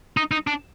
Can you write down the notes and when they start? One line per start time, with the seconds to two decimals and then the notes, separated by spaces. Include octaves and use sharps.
0.17 D#4
0.31 D#4
0.47 D4